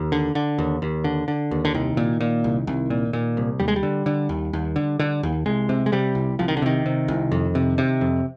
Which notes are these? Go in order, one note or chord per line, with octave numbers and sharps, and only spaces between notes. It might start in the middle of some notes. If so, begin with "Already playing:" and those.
Already playing: D#2
D3
D3
D#2
D#2
D3
D3
D#2
D3
C2 D#3
A#2
A#2
C2
C2
A#2
A#2
C2
D#2 G3
G#3
G3
D3
D3
D#2
D#2
D3
D3
D#2
C2 G#3
C3
G#3
C3 G3
C2
C2 F3
D#3
D3
C3 D#3
C3
C2
F2
C3
C3
F2